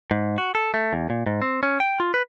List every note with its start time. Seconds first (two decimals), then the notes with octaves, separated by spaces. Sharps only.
0.11 G#2
0.38 F#4
0.55 A4
0.74 A3
0.93 E2
1.10 A#2
1.26 G#2
1.42 C4
1.63 C#4
1.80 G5
2.00 F4
2.14 B4